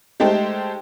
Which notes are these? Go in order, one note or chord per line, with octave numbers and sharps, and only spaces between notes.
G#3 A3 D#4 G4 A4 C5